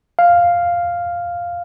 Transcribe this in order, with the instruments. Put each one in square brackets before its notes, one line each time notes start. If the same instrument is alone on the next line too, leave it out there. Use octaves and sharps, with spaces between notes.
[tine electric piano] F5